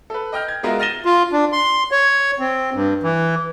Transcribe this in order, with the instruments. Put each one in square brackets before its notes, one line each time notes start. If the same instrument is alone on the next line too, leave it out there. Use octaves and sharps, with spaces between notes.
[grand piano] A4 B4
D#5 G5 F6 G6
G#6
G#3 B3 F4 F#4 A#4 E5
F6 A6 A#6 D#7 E7 G7
[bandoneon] F4
D4
C6
C#5
C4
G2
E3